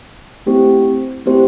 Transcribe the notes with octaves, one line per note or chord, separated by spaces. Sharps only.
A3 C4 E4 G4 C5
A3 C4 E4 G4 C5